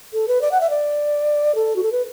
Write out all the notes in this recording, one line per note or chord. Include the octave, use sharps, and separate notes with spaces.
A4
B4
D5
F#5
E5
D5
A4
F#4
A4
B4